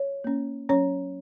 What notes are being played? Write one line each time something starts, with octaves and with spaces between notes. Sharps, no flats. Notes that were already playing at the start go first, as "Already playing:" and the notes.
Already playing: C#5
A#3 C#4
F#3 C#4 C#5